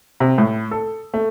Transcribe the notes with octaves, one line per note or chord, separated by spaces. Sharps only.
C3
A2
A4
A3